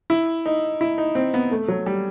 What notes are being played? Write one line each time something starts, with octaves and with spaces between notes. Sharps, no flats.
E4
D#4
E4
D#4
C4
B3
A3
F#3
G3